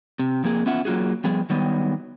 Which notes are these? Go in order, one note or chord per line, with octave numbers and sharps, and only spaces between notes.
C3
F2 A#3 G#4
B3 C#4 F4 E5 F#5
F#3 A#3 F4 F#4 G#4
F3 G3 B3 G#4
D#3 F#3 G3 B3